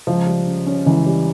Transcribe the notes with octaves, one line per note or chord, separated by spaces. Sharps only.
C#2 F3
G3
C#3
C#4
C#2 E3
G3